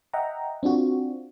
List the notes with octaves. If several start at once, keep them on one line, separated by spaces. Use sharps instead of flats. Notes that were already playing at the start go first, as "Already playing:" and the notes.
D#5 E5 F#5 G5 A#5
C4 D4 F4 F#4